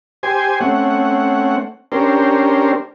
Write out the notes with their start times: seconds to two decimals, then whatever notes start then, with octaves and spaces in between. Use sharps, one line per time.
0.23 G4 C5 G#5
0.60 A3 C4 C#4 F#5
1.92 C#4 D4 G4 A#4 C5